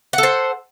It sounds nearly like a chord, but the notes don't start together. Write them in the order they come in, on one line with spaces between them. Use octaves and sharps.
F#5 A4 C5